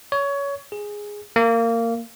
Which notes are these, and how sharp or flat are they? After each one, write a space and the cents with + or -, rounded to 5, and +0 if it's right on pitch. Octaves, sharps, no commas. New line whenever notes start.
C#5 +20
G#4 -5
A#3 -20